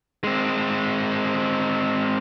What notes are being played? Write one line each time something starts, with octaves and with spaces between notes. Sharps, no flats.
G#3 C4